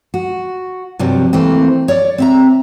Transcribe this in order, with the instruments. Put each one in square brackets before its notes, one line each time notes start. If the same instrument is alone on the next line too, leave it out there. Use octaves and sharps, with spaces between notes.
[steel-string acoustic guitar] F#4
G2 C3 F3 F#3
E3 A3 A#3 C4
C#5 D5
C4 E5 A#5